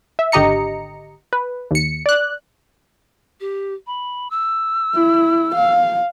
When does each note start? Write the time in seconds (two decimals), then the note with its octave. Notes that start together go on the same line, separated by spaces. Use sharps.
0.19 E5
0.32 G#1 D3 G4 D#5 A#5 C#7
1.33 B4
1.71 D#2 C#7
2.06 D5 F#6
3.40 G4
3.87 B5
4.31 E6
4.95 E4
5.55 F5